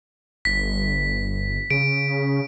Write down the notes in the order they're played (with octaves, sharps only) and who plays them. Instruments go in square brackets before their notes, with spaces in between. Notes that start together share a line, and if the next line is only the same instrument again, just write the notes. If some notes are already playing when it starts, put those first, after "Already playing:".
[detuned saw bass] G1 [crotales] B6
[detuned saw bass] C#3 [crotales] D7